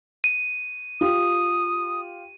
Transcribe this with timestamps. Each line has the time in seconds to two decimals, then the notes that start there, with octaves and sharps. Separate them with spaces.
0.24 D#7
1.01 F4 G4 D#6